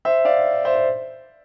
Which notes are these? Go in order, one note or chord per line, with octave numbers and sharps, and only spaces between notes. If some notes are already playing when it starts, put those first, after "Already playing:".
C5 E5
D5 F5
C5 E5
C5